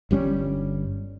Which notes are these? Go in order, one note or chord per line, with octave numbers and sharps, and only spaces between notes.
G1 G3 C4 C#4